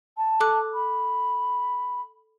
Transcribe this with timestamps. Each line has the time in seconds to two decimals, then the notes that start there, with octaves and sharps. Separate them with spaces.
0.17 A5
0.40 A4 D6 F#6
0.73 B5